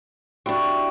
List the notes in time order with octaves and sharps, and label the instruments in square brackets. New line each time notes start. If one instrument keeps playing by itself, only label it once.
[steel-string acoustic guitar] D4 G4 [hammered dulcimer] E4 F#4